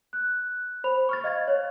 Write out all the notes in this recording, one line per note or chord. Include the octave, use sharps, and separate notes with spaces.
F#6
C5 B5 F7
C#6 F6 A6
D#5 F5 G#6 A6
C#5